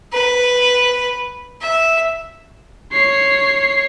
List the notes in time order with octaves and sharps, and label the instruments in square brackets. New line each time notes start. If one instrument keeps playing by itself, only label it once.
[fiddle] B4
E5
[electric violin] C#5 C7